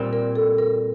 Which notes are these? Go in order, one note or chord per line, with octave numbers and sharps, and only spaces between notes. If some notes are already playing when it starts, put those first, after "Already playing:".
Already playing: A#2 G3 C4
A#4
A4
A#4